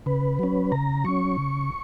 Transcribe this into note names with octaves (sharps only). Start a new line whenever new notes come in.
C#3 B4
F#3 C#4
C#3 A#5
F#3 C#4 C#6
C#3